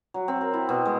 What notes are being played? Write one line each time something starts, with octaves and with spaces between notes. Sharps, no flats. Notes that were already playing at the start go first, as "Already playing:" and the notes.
F#3
C4
A#4
E4
B2
G#3